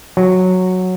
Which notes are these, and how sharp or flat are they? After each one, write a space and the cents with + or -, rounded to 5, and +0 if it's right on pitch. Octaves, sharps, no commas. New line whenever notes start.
F#3 -5